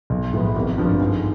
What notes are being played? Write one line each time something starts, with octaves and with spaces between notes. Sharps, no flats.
B1
A2 F3 G#3 B3
G#1
G2 D3 F3
G#2